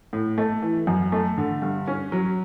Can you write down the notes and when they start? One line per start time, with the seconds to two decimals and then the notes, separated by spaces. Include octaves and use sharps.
0.13 A2
0.38 A3
0.62 E3
0.87 F#2
1.12 A3
1.38 D3
1.62 G2
1.87 C#4
2.12 F#3